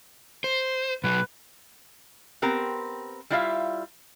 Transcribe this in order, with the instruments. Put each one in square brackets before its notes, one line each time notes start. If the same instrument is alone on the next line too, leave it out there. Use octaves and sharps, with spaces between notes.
[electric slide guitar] C5
[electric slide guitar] B2 F#3 [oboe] B4
[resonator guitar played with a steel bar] B3 C4 G4 A#4
G3 E4 F4 D5 E5 F5